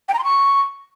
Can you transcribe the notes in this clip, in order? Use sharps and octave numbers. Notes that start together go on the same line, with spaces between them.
G5
A#5
C6
C#6